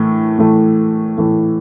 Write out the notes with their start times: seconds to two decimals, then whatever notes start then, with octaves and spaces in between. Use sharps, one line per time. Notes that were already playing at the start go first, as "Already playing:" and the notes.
Already playing: A2 E3 A3
0.38 A2 E3 A3
1.18 A2 E3 A3